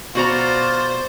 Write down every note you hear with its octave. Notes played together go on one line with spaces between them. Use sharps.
B2 F4 F#4 C5 D5 A#5